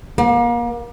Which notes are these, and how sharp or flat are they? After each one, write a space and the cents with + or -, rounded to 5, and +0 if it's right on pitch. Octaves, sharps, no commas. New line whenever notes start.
A#3 +35